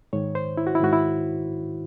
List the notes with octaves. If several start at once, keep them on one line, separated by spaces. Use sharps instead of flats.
G#2 D#3 C#5
C5
E4
F#4
E4
G#2 D#3 F#4
E4